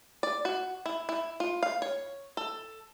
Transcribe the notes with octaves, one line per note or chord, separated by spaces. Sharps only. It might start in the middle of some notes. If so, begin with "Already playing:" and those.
D5
F#4
E4
E4
F4
F5
C#5
A4